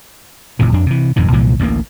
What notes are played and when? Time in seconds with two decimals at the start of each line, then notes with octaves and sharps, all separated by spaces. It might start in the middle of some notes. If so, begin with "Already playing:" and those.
0.59 F#1 A#2 C#3 E3
0.73 F2 D4
0.86 C3 E3
1.16 D#1 F2 G#2 D#3
1.32 C2 A#2 E3 F3
1.60 A1 D2 A3 A#3